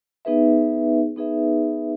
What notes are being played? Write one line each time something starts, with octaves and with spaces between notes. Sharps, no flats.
B3 D#4 G#4 B4 E5
B3 D#4 G#4 B4 E5